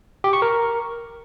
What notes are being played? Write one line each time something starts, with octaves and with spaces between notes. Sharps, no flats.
G4
C#6
A#4